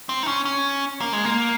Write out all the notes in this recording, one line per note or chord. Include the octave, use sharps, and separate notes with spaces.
C4
D#4
C#4
C#4
A#3
G#3
A#3